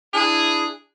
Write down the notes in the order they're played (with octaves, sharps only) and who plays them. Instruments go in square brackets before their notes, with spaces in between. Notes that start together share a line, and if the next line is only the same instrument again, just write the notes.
[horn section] D4 E4 G#4